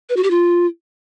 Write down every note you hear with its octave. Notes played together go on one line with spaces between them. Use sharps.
B4
F#4
G4
F4